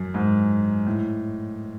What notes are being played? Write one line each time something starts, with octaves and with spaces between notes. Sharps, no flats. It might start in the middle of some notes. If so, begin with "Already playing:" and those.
Already playing: F#2
G#2
A2